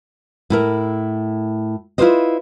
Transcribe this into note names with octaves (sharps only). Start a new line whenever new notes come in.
A2 E4 A#4
E4 F4 G#4 B4 C5 D#5